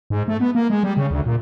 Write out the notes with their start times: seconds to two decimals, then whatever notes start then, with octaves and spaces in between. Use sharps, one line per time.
0.10 G#2
0.28 A3
0.40 B3
0.55 A#3
0.70 G#3
0.83 G3
0.97 C#3
1.11 D2
1.26 A#2